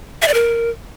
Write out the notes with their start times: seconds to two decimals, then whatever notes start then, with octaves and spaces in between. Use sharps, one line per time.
0.22 E5
0.28 D5
0.34 A#4